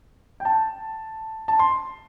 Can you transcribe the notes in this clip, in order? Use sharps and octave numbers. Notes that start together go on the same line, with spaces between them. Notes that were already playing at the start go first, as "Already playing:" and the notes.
G5
A5
A5
C6